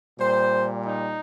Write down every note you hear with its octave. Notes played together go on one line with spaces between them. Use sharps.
A#2 G3 C5
D#4